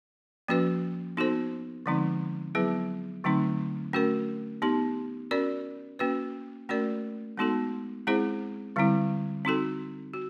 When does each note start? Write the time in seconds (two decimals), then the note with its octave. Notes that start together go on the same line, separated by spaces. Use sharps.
0.48 F3 A#3 C#4 F#4 B4
1.17 B3 D#4 F#4 A4 C5
1.86 D3 F3 G#3 C4 D#4
2.55 F#3 B3 E4 G#4 B4
3.24 D3 F#3 A3 C4 D#4
3.93 A3 C#4 F#4 A#4
4.62 B3 D#4 G4
5.31 C#4 F#4 A#4 D5
5.99 A#3 C#4 F#4 B4
6.69 A3 C#4 F#4 A#4 D5
7.37 G#3 B3 D#4 F#4 A4
8.07 G#3 C4 E4 G#4 C5
8.76 D3 G3 C4 E4
9.45 C4 D#4 F#4 A4
10.14 F#4